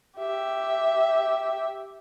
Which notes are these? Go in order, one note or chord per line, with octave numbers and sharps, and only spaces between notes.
G4 E5